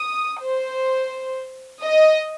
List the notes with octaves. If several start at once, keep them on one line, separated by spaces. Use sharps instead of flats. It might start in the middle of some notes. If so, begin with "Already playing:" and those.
Already playing: D#6
C5
D#5